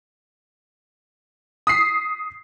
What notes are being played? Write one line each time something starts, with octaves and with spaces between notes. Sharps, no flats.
D#6 B6 C7